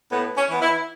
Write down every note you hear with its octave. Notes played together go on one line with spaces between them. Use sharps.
A2 B3
C#4
E3 B3
E4